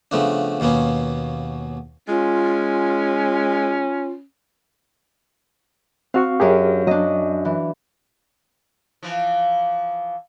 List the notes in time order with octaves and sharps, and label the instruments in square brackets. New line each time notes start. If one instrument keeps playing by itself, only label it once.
[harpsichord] C#3 F3 A3 B3 D4
D#2 B2 A#3 B3 C#4
[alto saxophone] G#3 [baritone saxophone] C#4 [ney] F4
[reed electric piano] C4 F#4 C#6 [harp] F5
[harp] F#2 D4 [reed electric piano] G4 G#4 A#4
[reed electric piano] F#3 [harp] D4 D#5
[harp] E3
[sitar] E3 F3